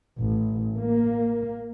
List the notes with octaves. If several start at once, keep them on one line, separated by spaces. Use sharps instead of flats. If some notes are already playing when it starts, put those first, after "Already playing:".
A1
A#3